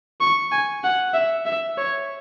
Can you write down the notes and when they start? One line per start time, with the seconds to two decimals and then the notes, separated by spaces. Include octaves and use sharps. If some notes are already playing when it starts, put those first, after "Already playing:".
0.21 C#6
0.52 G#5
0.83 F#5
1.14 E5
1.46 E5
1.78 C#5